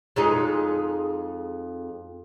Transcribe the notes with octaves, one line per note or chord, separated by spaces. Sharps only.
F2 G#3 D#4